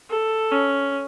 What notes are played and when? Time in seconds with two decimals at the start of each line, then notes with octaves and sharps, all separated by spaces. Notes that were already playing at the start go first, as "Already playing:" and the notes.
0.10 A4
0.51 C#4